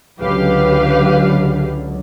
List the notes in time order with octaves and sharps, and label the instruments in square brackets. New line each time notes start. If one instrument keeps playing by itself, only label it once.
[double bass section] C#2 D3 F#3 [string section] G4 B4 F5